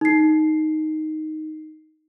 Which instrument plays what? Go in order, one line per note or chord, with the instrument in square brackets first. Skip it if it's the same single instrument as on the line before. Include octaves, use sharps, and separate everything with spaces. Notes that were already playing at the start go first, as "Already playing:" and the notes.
[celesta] D#4 C7